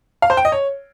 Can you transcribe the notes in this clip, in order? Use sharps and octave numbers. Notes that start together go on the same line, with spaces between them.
F5
C5
G5
D#5
C#5